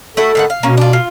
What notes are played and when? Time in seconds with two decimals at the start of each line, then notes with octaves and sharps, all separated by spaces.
0.17 A3 E4 F#4 A4
0.35 A2 D#3 F#5
0.50 F5
0.63 B2 A#3 C#4
0.77 D4 F4
0.93 F4